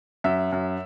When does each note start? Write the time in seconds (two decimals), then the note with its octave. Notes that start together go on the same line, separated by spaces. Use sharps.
0.24 F#2 E5
0.52 F#2